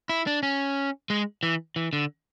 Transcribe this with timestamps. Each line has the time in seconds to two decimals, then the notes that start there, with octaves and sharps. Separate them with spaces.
0.09 E4
0.27 D4
0.43 C#4
1.10 G#3
1.43 E3
1.76 E3
1.93 D3